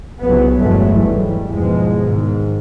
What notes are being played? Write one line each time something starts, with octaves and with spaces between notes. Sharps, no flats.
C2 C#3 F#3 B3
G1 E2 A#2 F#3 G#3 A3
G#2 E3 G3
E2 G#2 B2 F3 G#3
G#2 D#3